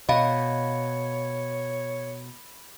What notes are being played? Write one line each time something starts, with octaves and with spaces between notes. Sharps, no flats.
B2 C#5 D#5 F5 B5